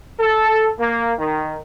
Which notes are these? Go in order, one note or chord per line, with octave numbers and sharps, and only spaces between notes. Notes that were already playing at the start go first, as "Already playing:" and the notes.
A4
A#3
D#3